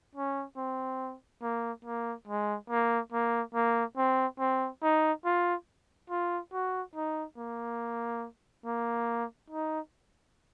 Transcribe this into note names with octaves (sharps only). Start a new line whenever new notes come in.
C#4
C4
A#3
A#3
G#3
A#3
A#3
A#3
C4
C4
D#4
F4
F4
F#4
D#4
A#3
A#3
D#4